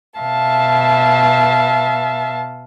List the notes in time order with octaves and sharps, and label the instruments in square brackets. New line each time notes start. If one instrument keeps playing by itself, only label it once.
[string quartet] B2 E5 F5 A5